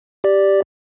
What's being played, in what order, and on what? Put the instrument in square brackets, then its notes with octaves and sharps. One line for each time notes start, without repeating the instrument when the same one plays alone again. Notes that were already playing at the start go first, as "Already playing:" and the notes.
[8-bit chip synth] G4 D5